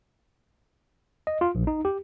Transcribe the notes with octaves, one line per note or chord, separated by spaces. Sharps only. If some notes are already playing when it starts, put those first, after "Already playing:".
D#5
F4
A#1
D#4
G4